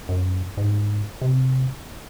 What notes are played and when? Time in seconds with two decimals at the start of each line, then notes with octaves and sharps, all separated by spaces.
0.09 F#2
0.57 G#2
1.21 C3